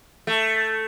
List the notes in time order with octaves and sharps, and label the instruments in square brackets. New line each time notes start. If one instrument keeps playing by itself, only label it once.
[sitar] A3